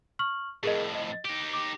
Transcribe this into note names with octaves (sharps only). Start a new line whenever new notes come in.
C#6 F6 F#7
F2 A2 G#4 A#4 D#5
D#5
D#4 G4 D7
D6